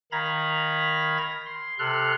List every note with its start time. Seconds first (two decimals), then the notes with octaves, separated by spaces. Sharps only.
0.12 D#3 F5 A#5 B5 G#6 A#6
1.46 C6
1.79 C3 A4 C6 F6 F#6